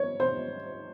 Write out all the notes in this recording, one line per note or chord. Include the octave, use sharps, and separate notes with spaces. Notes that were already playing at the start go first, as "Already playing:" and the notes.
Already playing: C#5
C5